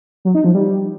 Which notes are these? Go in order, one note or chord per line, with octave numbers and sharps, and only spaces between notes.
F#3
D#4
F3
G3